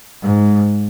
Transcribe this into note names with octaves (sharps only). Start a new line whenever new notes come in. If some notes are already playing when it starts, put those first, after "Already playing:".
G#2